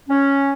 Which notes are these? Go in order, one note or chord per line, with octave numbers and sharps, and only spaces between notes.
C#4